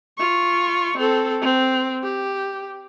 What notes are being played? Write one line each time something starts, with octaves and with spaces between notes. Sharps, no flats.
F4 C#6
C4 A4
C4
G4